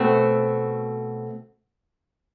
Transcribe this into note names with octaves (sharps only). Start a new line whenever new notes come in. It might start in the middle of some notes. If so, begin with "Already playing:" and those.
Already playing: B2 A3 C4